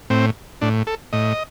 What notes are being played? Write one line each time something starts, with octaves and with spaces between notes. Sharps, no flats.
A2 C4
A2 D4
A4
A2 D#5